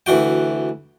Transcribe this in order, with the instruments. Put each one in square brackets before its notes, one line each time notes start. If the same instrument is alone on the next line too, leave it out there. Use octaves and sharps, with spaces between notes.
[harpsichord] D2 E3 F#4 G5